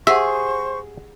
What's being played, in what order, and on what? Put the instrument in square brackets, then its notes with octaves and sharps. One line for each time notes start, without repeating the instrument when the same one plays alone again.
[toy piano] G4 F#5 [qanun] G#4 [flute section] C5 C#6 [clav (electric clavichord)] E5